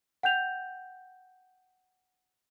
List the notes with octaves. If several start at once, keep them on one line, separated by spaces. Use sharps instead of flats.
F#5 G5 G6 F7